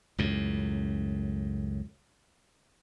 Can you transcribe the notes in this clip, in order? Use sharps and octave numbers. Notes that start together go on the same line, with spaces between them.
C#2 F#2 A2